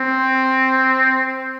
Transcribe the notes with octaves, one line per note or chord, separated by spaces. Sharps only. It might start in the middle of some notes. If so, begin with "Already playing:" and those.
Already playing: C4